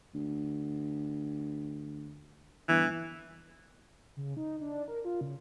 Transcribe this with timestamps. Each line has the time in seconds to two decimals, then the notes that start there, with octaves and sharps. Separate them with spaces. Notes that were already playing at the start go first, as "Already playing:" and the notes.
0.14 D2
2.69 G1 E3
4.16 C#3
4.37 D#4
4.61 D4
4.88 A#4
5.05 F4
5.21 C#3